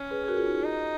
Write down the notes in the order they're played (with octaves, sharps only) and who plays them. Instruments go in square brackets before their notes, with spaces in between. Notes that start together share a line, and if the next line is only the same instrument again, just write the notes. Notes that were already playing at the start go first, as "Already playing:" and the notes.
Already playing: [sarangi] C#4
[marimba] G#4 B4
G#4
F#4 A#4
F4 G#4
D#4 F#4
F4 G#4
[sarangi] D#4